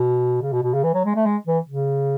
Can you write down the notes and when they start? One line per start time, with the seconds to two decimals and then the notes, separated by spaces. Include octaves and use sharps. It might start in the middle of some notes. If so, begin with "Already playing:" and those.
Already playing: B2
0.41 C#3
0.52 B2
0.63 B2
0.74 C#3
0.83 E3
0.94 F#3
1.05 G#3
1.15 A3
1.26 G#3
1.47 E3
1.69 C#3